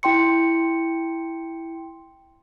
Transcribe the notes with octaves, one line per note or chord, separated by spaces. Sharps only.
E4 G5 C6 C#7